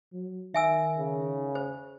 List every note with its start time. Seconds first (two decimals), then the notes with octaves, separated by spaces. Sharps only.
0.13 F#3
0.54 D#3 E5 G#5 E6
0.98 C#3
1.55 C5